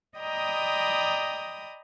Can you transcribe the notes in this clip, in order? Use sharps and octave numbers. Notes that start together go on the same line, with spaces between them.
D5 D#5 G5 A#5 B5 D#6